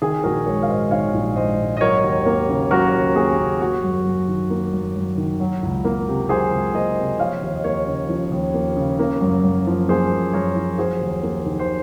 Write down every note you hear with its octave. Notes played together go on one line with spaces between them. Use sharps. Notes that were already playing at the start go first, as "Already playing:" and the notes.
D#3 G#4
A#1 F#4 A#4
G#3 A#4 C#5
F5
G#2 C5 D#5
D#3 C#5 F5
A#1
G#3 C5 D#5
G#2
D#5
F#3 A#4 C#5
D#2
A#3
C#3
F#3 F#4 A#4
D#2
A#3 G#4
C#3
A#3 F#4
F#2
F#2
D#3
A#3
F#2
F#2
D#3
F#3
C#2
A#3
C3
F#3 G#4 C5
C#2
A#3 C5 D#5
C3
F3 C#5 F5
D#2
D#5
A#3 A#4 C#5
C#3
F3
D#2
A#3
C#3
A#3
F#2
F#2
F3
A#3 G#4 C5
F#2
F#2 A#4 C#5
F3
F#3 G#4 C5
D#2
A#3
D#3
C5